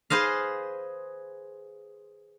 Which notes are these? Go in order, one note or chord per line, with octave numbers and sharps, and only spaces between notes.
G#4 B4 C5 D#5 F5